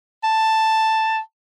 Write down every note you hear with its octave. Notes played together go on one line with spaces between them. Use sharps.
A5